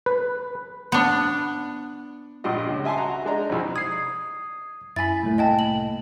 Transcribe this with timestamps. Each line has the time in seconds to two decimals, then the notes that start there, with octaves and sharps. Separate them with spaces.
0.06 B4
0.92 B3 D4
2.44 A#1 G2 G3 F4 D#5
2.69 C#2
2.84 D#5 E5 G#5 A5 C6
2.97 F#4 A#5
3.25 G#3 D4 D#4 A#5
3.49 C2 F2
3.76 D#6 G#6 C7
4.96 F#2 E4 G#5 B5 A6
5.23 C2 A2 A#3
5.38 D#5 G5 A5
5.59 F#7